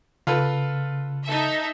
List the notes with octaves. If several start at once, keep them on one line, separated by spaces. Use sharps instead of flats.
C#3 F4 A4 B4
D#4 A4 E5